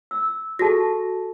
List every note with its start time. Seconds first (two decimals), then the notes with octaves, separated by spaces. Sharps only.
0.11 E6
0.59 F#4 G#4 A4 A5 A#6